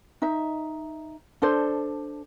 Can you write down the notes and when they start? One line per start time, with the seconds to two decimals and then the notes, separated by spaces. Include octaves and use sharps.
0.22 D#4 E5
1.42 D4 A4 C5